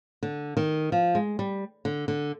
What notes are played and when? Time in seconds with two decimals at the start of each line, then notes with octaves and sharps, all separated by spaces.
0.23 D3
0.57 D#3
0.92 F3
1.15 G#3
1.39 G3
1.85 D3
2.08 D3